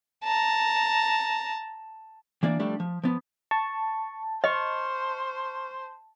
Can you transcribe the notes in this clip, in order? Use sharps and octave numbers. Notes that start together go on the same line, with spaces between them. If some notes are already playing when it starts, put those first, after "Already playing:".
A5 A#5
E3 A#3 D4 D5
F3 G3 A3 D4
F3
F3 B3
A5 C#6
C5 D#5 C#6 F6